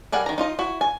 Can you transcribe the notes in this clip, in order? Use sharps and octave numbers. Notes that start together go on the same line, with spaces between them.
G3 G#4 A#4 F#5
D#3 A#5
D#4 F4 D#5
E4 F#4
G#5